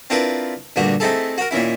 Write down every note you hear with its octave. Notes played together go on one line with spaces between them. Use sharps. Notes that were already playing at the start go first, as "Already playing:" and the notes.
C4 D4 E4 F4 A#4 B4
D2 G2 A#2 F#4
A3 C4 D#4 E4 G#4 A4
F#4 A#4
A#2 D#3 C#4 E4